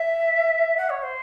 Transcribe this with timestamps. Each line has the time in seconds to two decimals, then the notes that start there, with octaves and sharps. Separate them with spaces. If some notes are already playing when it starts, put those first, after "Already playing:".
Already playing: E5
0.77 F#5
0.89 C#5
1.03 C5